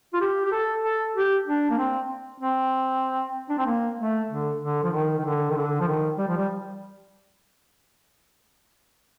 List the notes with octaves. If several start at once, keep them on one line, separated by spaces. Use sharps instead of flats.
F4
G4
G4
A4
A4
G4
D4
A#3
C4
C4
D4
C4
A#3
A3
D3
D3
F3
D#3
D#3
D3
D#3
D3
F3
D#3
G3
F3
G3